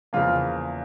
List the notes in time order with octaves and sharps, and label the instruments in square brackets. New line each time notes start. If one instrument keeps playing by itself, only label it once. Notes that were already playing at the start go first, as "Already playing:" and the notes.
[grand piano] E2 C#3 F3 A#3 F4